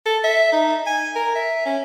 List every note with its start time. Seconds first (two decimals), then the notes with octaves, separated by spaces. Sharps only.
0.06 A4
0.24 E5
0.53 D#4
0.87 G#5
1.16 A#4
1.35 E5
1.66 C#4